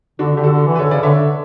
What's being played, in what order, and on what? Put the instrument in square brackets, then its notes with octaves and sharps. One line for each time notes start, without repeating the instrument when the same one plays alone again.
[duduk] D3 [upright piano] D4 F#4
[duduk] D3 [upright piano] G4
[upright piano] F#4 A4
[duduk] D3
E3
[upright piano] B4
[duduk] D3 [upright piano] A4 C#5
[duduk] C#3 [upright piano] B4 D5
[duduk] D3 [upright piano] C#5 E5
[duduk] D3